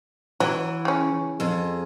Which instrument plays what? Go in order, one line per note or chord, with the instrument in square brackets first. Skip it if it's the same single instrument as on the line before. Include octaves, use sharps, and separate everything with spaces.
[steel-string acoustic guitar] E3 [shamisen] F#3
[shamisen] C#3 C#4
[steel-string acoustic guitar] F2 G#4